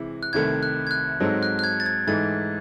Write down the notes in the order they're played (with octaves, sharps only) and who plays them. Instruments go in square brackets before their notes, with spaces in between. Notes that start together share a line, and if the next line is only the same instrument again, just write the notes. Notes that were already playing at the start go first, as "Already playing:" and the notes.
Already playing: [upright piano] C3 E3 G#3 E4
[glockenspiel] F#6
[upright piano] C2 C3 D#3 A3 [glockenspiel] G#6
[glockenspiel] F#6
G#6
F#6
[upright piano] G#2 F#3 C4 D#4 A4
[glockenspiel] F#6
F#6
G#6
A6
G#6
[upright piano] G#2 E3 A3 D#4 [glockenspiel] A6